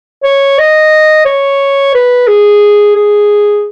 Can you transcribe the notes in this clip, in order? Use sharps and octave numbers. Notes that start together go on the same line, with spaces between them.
C#5
D#5
C#5
B4
G#4
G#4